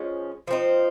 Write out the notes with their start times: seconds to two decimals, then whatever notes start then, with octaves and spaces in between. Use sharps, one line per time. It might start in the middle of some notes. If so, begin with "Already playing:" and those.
Already playing: F3 G#3 C#4
0.47 F3 C4 D#4